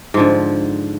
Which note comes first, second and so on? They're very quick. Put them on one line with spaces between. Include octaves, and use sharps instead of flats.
G#2 F3 D3